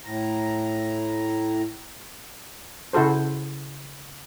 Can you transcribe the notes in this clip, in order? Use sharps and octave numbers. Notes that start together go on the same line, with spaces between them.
A2 A#5
C#3 E4 F#4 A4 C5